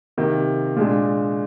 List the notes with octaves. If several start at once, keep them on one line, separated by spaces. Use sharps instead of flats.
C3 D#3 A#3
A#2 G#3 D4